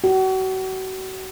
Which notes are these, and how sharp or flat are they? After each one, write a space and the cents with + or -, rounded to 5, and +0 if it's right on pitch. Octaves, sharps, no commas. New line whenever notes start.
F#4 +35